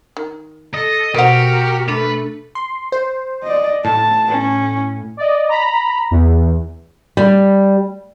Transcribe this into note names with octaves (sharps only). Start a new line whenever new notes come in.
D#3
A4 D#5
B2 A#3 F#4 G4 A#4 C5 F#5
A3 D4 A4 B4
C6
C5
D5 D#5
A2 A5
C#4
D5 D#5
A#5 B5
E2
G3